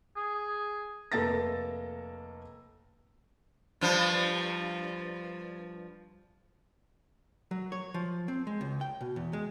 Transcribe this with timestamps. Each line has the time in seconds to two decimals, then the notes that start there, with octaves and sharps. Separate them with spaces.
0.17 G#4
1.12 F1 A3 A#3 A4 A6 A#6
3.81 G2 F3
7.51 F#3
7.72 C#5
7.94 F3
8.28 C4
8.47 G#3
8.61 C#2
8.81 G5
9.01 B2
9.16 E2
9.33 G#3